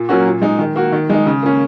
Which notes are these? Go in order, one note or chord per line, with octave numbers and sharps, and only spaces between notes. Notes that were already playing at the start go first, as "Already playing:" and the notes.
Already playing: A#2
F#3 A#3 C#4 F#4
A#2
G#3 D#4
D#3
A#3 F#4
D#3
G#3 D#4
C#3
A#3 C#4